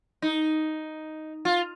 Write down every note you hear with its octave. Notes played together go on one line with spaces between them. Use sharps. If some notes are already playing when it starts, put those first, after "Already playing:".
D#4
F4